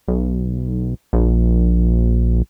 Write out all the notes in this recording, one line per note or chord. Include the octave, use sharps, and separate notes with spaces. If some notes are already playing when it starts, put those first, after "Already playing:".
B1
A#1